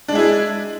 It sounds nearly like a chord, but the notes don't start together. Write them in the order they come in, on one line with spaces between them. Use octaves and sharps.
D4 G#3 E4 G#4